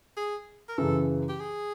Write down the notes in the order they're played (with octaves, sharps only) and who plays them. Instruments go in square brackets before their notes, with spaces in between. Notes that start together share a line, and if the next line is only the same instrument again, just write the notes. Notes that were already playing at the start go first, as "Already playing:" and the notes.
[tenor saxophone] G#4
A#4
[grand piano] F#2 C#3 E3 [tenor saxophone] A4
[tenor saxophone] G4
G#4